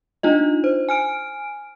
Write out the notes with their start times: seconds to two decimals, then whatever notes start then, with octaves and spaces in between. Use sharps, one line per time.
0.23 D4 D#4 F4 D#5
0.64 C5
0.89 G#5 F6 D7